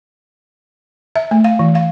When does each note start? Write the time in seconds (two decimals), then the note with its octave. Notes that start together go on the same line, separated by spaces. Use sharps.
1.16 E5
1.31 A3
1.44 F5
1.59 E3
1.75 F5